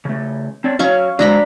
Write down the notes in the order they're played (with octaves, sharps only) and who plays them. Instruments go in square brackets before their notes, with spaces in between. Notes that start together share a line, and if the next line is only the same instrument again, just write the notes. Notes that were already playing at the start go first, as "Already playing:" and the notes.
[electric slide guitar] C#3 A3
C4 D4 C#5
[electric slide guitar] F#3 C#5 [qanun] C#4 F5 C#6
[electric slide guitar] F#3 G#3 C5 [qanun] D4 A#5 B5